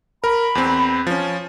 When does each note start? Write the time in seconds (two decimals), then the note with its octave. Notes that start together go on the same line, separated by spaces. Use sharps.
0.24 A#4 B5
0.55 E2 C4
1.07 F3 C#4